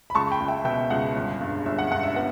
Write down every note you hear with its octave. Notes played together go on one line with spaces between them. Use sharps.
B5
C#2 A5 C#6
G5 B5
C#2
E5 G5
B2 E5 G5
C#2 F#5
G1
G2
G1 E5
F#5
G2 F#5
E5
B3 F#5